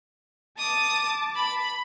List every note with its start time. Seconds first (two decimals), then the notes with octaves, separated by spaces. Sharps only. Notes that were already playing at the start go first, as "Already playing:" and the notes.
0.58 A5 D6 D#6
1.35 B5